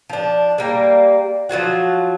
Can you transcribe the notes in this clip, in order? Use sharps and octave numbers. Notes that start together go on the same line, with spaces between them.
F3 D4
G3 A#3
F3 F#3 F4 F#4